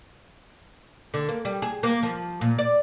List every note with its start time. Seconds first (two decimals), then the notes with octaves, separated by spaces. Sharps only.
1.14 D3
1.29 A#3
1.45 G3
1.62 G#4
1.83 A#3
2.03 F3
2.41 A#2
2.58 D5